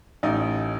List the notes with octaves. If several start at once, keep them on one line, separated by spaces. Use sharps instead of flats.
A1 D#4